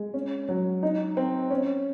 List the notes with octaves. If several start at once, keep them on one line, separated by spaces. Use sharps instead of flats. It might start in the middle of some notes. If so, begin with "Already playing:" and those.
Already playing: G#3
C#4
F#3
D#4
C4
C#4